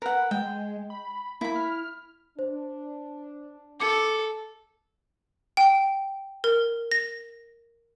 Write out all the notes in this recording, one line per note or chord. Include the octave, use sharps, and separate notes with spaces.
A#4 B4 F#5
G#3 G5
B5
A#3 E4 B5
F6
D4 C5
A4 D6 C#7
G5
A#4
A#6